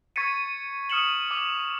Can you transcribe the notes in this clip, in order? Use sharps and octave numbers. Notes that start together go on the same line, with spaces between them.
C#6 G#6 A6 B6 C#7 D#7
D#6 F6 C#7 E7 F#7
D6 F6 F7 F#7